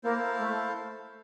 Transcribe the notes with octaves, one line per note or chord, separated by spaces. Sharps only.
A#3 E4 A4 C5 F5
A3